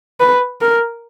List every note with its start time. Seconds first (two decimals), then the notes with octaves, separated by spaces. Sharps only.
0.20 B4
0.61 A#4